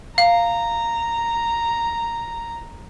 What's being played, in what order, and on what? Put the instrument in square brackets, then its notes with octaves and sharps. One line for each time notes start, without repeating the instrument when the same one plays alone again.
[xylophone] F5 [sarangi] A#5